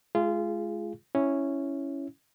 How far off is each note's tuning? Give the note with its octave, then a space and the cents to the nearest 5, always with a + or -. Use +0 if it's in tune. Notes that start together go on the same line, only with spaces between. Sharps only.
G#3 +40 F4 -20 G#4 +0
C#4 +0 E4 +0